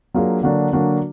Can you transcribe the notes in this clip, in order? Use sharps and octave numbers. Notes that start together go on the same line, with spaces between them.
F#3 A#3 D4 F4 G#4
D3 F#3 A#3 D4 F#4
D3 F#3 A#3 D4 F#4